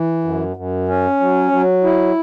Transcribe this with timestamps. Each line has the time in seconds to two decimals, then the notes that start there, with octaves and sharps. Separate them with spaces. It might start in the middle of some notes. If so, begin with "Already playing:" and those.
Already playing: E3
0.24 F#2
0.56 F#2
0.88 C#4
1.20 F#3
1.52 F#3
1.84 E4